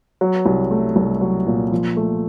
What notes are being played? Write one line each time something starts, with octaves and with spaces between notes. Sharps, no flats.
F#3
C2
A3
C2
F#3
A#2
F3
A3